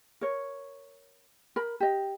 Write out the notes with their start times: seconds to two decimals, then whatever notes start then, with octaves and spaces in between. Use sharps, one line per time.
0.21 A#4 C#5
1.56 A#4 B5
1.80 G4 D#5